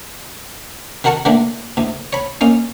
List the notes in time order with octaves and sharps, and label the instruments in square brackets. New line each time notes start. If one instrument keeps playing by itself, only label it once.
[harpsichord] D#3 F#4 A#4 F#5 A5 C#6
D3 E3 A3 A#3 D4
D2 A2
C#5 B5
A#3 C#4 D#4